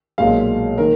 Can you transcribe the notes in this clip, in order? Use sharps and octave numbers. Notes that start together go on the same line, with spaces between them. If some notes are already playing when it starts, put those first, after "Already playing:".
B1 A#2 G#3 F5
D#3 A#3 A#4